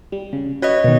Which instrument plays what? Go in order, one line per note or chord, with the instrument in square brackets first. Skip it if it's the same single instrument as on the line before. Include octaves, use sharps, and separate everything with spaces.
[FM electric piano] G3
C#3
[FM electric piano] F#4 B4 [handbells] C#5 D#5
[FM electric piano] B2 D#3